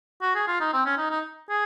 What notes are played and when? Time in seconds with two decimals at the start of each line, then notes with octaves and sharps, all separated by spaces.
0.22 F#4
0.35 G#4
0.48 F4
0.60 D#4
0.73 C4
0.86 C#4
0.98 D#4
1.11 D#4
1.50 G#4